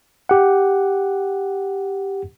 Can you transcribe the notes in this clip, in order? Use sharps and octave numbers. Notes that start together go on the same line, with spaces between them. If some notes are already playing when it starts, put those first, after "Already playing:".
G4 F#5